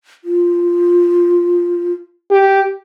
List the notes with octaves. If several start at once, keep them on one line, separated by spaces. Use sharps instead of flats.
F4
G4